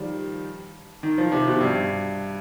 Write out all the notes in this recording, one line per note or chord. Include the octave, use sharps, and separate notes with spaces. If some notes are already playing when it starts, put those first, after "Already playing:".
Already playing: D#3 F3 G3
D#3
F3
C3
B2
G2